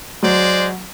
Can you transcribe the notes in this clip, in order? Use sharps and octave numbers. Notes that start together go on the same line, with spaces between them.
F#3 G#3 C5 D5